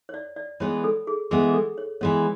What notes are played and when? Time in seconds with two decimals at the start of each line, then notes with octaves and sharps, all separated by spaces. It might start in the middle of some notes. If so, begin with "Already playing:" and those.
0.09 C#5
0.14 D5
0.36 D5
0.60 E3 G#3 B3 C#5
0.84 A4
1.07 G#4
1.31 E3 G#3 B3 G#4
1.49 G#4
1.54 A4
1.78 C#5
2.01 E3 G#3 B3 C#5